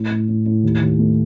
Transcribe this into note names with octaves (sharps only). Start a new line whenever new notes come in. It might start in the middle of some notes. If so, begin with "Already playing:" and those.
Already playing: A2
A2
A2
A2
D#2
D#2
A3